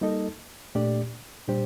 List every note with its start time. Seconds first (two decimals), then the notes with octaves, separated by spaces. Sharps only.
0.01 G3 A#3 D#4 A4 D#5
0.75 A#2 A3 D4 G4 D5
1.47 A#2 G3 D4 G4 C5